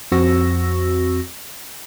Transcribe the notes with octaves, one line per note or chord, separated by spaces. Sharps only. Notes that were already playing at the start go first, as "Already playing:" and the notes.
F2 C4 F#4 C#6 E6 A#6